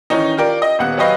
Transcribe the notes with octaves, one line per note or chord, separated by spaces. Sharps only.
D#3 E3 C#4 D#4
F4 G4 A#4 D5
D#5
D#1 B3 F#5 F#6
F#3 G4 B4 C#5 D#5 F5